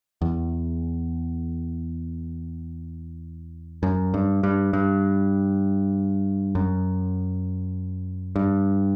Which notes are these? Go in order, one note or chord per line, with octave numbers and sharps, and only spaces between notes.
E2
F#2
G2
G2
G2
F#2
G2